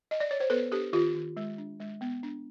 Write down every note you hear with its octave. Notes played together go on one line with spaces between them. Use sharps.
D#5
D5
C#5
C5
B3 A4 B4
D4 G4 A4
D#3 F4 G4
D#3
G#3
D4
G#3
B3
D4